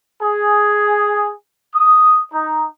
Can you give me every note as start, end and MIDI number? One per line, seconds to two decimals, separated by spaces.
0.22 1.32 68
1.75 2.23 87
2.33 2.67 63